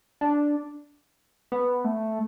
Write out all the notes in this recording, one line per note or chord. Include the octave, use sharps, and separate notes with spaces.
D4
B3
A3